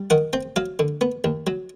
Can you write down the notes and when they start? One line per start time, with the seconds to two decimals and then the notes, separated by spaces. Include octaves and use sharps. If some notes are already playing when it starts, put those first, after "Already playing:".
Already playing: G3
0.10 D#3 F#5
0.33 C4 G5
0.56 F#3 F5
0.79 D3
1.01 B3
1.24 D#2
1.47 F#3